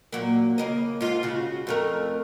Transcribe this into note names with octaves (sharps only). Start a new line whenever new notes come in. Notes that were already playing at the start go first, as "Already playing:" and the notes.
A#2 F#3 A#3
C#3 A#3 D#5
G#2 F4
C#3 F#4
F2 A3 A#4